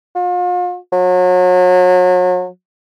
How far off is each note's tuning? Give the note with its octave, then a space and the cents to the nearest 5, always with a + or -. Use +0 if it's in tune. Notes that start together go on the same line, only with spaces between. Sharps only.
F4 +40
F#3 -35